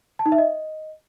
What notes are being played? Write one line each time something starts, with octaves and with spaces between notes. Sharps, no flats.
A5
D#4
E5
D#5